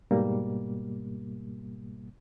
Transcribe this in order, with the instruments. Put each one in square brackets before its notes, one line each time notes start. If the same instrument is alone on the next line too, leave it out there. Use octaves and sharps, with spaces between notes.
[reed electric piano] G#2 B2 G3 A#3